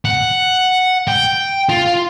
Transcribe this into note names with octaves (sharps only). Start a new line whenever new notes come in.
F#5
G5
F4